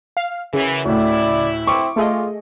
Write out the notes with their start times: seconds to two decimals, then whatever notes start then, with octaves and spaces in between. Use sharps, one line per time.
0.17 F5
0.53 F#2 C#3 E3
0.85 D2 A2 E4 D5
1.67 C4 C#6 D6
1.96 A3 F4 G#4 D#5